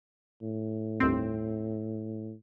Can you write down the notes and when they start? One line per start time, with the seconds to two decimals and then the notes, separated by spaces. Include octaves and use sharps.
0.42 A2
1.00 G1 D#2 C4